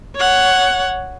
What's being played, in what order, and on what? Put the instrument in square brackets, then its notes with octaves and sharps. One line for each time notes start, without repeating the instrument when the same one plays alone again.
[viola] C#5 F#5